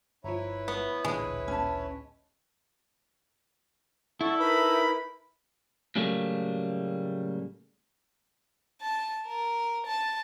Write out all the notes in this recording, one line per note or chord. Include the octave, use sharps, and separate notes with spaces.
G1 F3 E4 B4 C#5 A#5
A3 B3
A1 D2 A#2 G#3 G5 G#5
C#4 A5
E4 A4 D5 F#5 C#6
D#4 A#4 B4 B5
A2 C#3 F#3 G3 A3 A#3
A5
A#4
A5